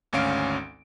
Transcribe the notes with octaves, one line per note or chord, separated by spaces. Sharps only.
G#1 D2 C#4 F5 D7